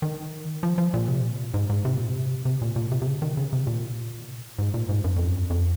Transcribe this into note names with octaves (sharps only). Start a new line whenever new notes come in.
D#3
F3
F3
A#2
C3
A#2
G#2
G#2
C3
A#2
C3
C3
A#2
A#2
C3
C3
C#3
D#3
C#3
C3
A#2
G#2
A#2
G#2
F#2
F2
F#2
F2